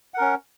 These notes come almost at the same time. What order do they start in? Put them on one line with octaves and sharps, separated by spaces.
F#5 A#4 C#4